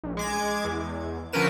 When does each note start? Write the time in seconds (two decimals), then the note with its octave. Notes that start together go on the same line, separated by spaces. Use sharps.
0.04 A#1
0.17 G#3 D6 G#6
0.64 E2
1.33 D3 F3 C#4 A#4 B4 E7